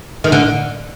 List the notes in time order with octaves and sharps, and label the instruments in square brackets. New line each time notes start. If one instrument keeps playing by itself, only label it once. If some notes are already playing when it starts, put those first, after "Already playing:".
[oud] D#3
D3